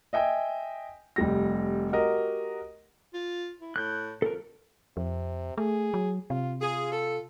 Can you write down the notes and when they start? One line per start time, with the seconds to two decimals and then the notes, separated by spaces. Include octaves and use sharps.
0.13 D#5 E5 G5 G#5
1.16 F1 G3 A#6
1.92 F#4 G4 A#4 D#5
3.14 F4
3.60 E4
3.76 A2 F#6 G6
4.22 F2 A4 A#4
4.97 F2 C3
5.58 A3 G#4
5.94 F#3
6.30 C3 F4
6.61 F4 G#4
6.92 A4